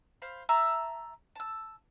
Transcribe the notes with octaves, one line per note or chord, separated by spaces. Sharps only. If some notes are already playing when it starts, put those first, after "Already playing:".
C5 F5 B5
E5 A5 A#5 E6
A5 E6